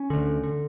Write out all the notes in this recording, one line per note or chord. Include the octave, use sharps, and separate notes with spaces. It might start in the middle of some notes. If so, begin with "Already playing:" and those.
Already playing: C#4
D2 D3
D3